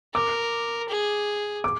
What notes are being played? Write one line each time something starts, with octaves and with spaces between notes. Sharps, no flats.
A#4 D6
G#4
D6